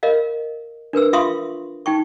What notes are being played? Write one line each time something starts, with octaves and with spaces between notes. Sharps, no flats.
A#4 D#5 F5
D4 A#4 B4 E6
F4 E5 F5 C6 C#6 D#6
D#4 G5 C#6